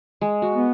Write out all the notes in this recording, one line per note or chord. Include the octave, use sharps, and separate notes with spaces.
G#3
F#4
B3